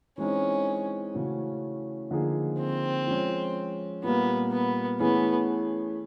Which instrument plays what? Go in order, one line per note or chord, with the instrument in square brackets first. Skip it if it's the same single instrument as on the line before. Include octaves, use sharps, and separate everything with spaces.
[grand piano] E3 G#3 C4 D#4 [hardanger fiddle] C#4
[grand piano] C#3 E3 A3 C#4 F#4
D3 F3 A#3 D#4 G#4
[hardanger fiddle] C4
[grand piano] F3 G#3 C#4
[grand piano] A#2 G3 A#3 [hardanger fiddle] B3
[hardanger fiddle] B3
[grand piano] E3 A3 C#4 E4 G#4 [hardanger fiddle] B3